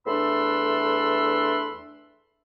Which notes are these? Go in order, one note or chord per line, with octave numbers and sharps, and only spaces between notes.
E2 A3 D4 B5 C6 E6